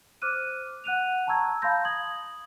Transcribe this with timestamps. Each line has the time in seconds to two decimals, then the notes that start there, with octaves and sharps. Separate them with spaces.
0.22 C5 D6 F6 F#6 D#7
0.84 F#5 F#6 D#7 F7
1.27 A5 A#5 C#6 E6 G#6
1.62 F5 A5 B5 C6 G6 A#6
1.85 D#6 G#6 F#7